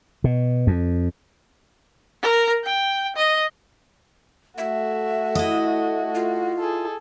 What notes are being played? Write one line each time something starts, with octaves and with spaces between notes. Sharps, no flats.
B2
F2
A#4
G5
D#5
A3 F#4 E5
E4 D#5
F4
G#4 A4